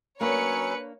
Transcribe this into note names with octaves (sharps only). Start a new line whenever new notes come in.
F#3 A#3 C#4 D4 B4 C#5 D5 C#7